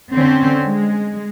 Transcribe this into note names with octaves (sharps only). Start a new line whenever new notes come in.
D3 C4 C#4
G#3